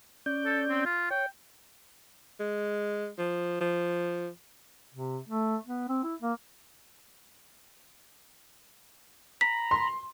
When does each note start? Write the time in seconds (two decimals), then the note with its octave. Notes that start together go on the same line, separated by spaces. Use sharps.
0.26 C#4 D5 G6
0.46 A4
0.70 C4
0.85 F4
1.11 C#5 G5
2.40 G#3
3.18 F3
3.60 F3
4.94 C3
5.29 A3
5.66 B3
5.89 C4
6.04 E4
6.22 A#3
9.41 A#5 B5 B6
9.71 C6